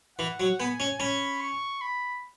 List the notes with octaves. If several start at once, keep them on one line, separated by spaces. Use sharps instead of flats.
E3 F#5
F#3
B3 G#5
C#4
C#4 B5
C#6
B5